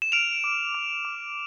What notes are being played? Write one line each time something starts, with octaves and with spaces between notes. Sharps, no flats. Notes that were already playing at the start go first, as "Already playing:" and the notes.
E7
F6 D7 F7
D6
D6
D6